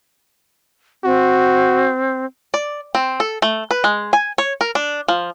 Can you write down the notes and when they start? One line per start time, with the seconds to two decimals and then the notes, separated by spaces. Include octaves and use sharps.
1.04 C4 F#4
2.54 D5
2.95 C4
3.20 A4
3.42 A3
3.71 B4
3.84 G#3
4.13 G#5
4.38 C#5
4.61 A#4
4.75 D4
5.08 F3